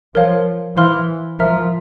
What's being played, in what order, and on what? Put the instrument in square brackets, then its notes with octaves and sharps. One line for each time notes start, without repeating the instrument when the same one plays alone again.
[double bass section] F3 [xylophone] A#4 C#5 F5
[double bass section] E3 [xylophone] C5 F5 C6 F6
[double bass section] F3 [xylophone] A#4 E5 A#5 F6